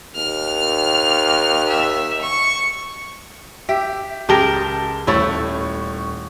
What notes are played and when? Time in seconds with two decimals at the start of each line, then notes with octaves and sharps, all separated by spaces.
0.15 D#2 F6
1.68 E5
2.21 C#6
3.69 G4 E5
4.29 C#2 G4 G#4 A#4 A5 G7
5.07 D#1 A3 E4 C#5 A6